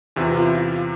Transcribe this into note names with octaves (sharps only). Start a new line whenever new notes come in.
E2 C3 E3 F4
F4
E4
F4